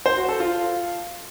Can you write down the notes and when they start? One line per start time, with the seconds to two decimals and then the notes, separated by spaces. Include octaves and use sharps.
0.06 C5
0.17 F#4
0.29 A4
0.40 F4